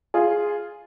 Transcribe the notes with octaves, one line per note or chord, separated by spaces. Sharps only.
F4 G#4